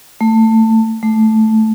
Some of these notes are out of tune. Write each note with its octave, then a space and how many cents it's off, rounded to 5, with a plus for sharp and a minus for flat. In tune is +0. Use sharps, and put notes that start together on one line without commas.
A3 +20
A3 -5